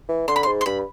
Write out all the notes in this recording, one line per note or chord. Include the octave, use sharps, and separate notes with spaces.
E3
D3 C6
B5
C6
G#2
C6
G2 B5